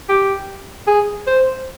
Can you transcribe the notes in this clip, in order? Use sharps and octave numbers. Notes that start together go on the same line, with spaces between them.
G4
G#4
C5